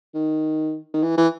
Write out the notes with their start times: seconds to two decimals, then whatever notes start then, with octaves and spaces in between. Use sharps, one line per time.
0.15 D#3
0.94 D#3
1.03 E3
1.17 E3